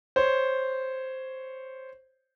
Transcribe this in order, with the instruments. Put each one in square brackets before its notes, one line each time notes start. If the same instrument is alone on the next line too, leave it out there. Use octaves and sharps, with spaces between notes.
[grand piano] C5 C#5